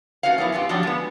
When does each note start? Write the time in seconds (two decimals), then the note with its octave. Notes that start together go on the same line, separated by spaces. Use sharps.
0.23 A3 C#4 F#4 B4 C#5 F5
0.38 F#3 A#3 B3 E4
0.52 F#2 B3 F4 G4
0.69 F3 F#3 D4 F#4 G4
0.83 G#3 B3